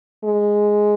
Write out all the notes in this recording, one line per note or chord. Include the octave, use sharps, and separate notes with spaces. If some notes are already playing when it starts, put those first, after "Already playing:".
G#3